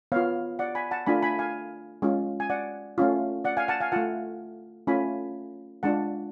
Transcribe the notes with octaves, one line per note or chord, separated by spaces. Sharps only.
B3 F4 C#5 F5
D5 F#5
G#5 B5
F#5 A5
A3 D4 F4 G#5 B5
G#5 B5
F5 G#5
G#3 C#4 F4
G#5
D5 F#5
A3 C#4 F4
D5 F#5
F5 G#5
F#5 A5
F5 G#5
A3 F4 F#5 A5
A3 C#4 F4 G#5 B5
G#3 D4 F4 F#5 A5